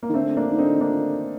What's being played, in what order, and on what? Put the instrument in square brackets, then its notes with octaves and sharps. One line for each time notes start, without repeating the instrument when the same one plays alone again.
[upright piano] A#3
[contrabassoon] D#3
[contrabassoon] D3 [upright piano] A3 C4
[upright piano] A#3 D4
[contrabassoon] D#3
[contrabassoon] D3 [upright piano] C4 D#4
[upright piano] A#3 D4